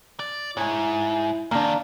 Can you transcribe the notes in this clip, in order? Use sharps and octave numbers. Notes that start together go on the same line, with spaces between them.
D5
G#2 E4 C#5 G#5
F#2 D#3 A#3 D4